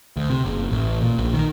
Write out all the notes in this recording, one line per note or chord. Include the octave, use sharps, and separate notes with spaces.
D2
C3
F#1
A1
A#2
A#1
D#3